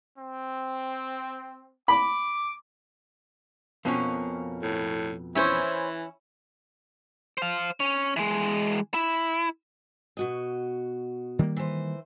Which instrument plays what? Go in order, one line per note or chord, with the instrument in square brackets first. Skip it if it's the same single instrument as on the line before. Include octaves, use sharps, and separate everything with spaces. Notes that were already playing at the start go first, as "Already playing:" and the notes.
[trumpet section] C4
[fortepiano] B5 [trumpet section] D6
[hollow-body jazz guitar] F2 B2 F3 [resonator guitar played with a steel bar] A#3 C#4
[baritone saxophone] A2
[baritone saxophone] E3 [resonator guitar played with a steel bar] C#4 E4 [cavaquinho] C5 C#5 E5
[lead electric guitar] C5 F5
C#4
E3 G#3
E4
[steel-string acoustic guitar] B2 F#4 D#5
[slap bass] D#3 G3 A#3
[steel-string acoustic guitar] E3 C5